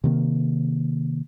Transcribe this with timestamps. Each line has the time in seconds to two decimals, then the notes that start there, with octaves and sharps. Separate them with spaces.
0.04 C3 D#3 A#3